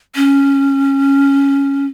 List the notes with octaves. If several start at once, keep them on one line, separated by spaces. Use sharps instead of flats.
C#4